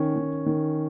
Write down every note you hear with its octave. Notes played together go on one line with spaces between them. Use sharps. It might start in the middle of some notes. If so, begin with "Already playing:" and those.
Already playing: D#3 C#4
D#3
D#3